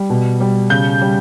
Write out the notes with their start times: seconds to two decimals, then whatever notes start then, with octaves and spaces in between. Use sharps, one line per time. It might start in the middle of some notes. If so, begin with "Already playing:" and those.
Already playing: G3
0.10 B2
0.40 G3
0.70 C#3 G6
1.01 G3